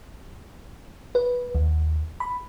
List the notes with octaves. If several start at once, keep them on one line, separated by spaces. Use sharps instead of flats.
B4
D#2
B5